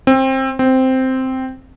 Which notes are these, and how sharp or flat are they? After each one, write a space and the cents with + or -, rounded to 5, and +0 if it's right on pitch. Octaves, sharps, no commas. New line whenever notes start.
C4 +20
C4 -5